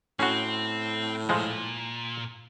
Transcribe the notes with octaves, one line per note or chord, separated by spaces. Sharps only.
A2 C4 C#4 F#4
A#2 F3 G#3